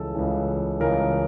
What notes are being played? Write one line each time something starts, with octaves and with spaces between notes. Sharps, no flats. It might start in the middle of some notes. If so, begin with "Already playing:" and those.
Already playing: C#2 C#3 E3 A4
C#2 C#3 E3
C#2 C#3 E3 A#4